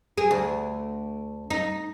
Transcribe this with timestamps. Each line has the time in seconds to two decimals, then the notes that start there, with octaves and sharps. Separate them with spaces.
0.18 G#4
0.31 D2
1.50 D#4